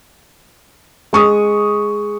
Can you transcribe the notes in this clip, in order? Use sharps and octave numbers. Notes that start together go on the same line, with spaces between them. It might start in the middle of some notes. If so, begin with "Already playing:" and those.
G#3 C#6 D#6